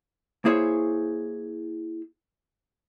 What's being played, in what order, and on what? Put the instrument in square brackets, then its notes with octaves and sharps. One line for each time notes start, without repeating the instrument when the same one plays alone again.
[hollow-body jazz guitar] A#3 E4 G#4 C5 C#5